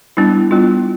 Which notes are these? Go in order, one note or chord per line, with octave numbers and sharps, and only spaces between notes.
G3 B3 D4 E4
G3 B3 D4 F4